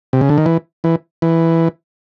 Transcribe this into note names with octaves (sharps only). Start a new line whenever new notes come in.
C3
C#3
D3
D#3
E3
E3
E3